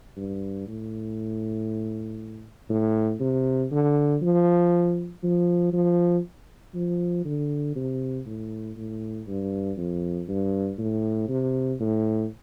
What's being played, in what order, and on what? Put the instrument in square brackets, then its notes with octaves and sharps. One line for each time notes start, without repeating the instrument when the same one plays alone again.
[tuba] G2
A2
A2
C3
D3
F3
F3
F3
F3
D3
C3
A2
A2
G2
F2
G2
A2
C3
A2